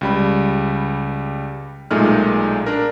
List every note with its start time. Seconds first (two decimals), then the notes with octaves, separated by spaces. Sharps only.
0.01 C#2 G3 B5
1.91 B1 A#2 G#3 A3 D#4 F6
2.66 D4 A#4